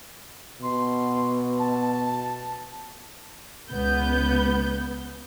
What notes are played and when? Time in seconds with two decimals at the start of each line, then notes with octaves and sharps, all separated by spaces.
0.62 B2 C6
1.58 A5
3.70 C#2 B3 G6